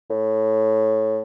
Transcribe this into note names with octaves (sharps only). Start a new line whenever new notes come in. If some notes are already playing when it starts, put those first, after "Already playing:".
A2